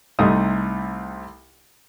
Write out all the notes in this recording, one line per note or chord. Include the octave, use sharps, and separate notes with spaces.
C2 C3 A3 D#4 D#6